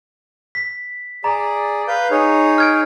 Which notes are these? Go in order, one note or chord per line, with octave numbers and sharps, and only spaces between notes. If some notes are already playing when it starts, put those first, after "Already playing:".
B6
G#4 D5 A#5
B4 F5 G6
D#4 G#4 C#5
F6 G#6 D7